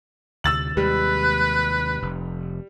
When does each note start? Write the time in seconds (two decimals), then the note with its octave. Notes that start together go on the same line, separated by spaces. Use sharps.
0.44 D2 C3 E6 A6 F#7
0.77 D#2 C3 G3 G#3 B4
2.02 F1